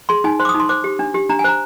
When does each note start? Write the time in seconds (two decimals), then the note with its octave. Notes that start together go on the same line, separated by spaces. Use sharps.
0.09 G#4 C6
0.24 D#4 G#5
0.39 C5 C6
0.45 D6
0.49 D#6
0.54 D#4
0.60 C6
0.69 C5 D6
0.84 G4
0.99 D4
1.14 G4
1.29 D4 A#5
1.39 G#5
1.44 C5 A#5